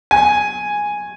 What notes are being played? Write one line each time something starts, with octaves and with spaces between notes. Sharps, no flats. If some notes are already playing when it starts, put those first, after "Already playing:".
G#5